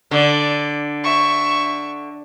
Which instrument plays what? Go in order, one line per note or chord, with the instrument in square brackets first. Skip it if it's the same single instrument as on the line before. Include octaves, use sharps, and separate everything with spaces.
[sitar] D3 [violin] D5
[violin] E5 C#6